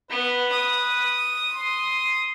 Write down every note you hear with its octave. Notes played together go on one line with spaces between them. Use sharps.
B3 B4
D#6
C6